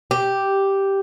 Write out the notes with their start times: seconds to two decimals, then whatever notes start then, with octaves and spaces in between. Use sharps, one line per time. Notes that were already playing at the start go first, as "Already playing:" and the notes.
0.11 G4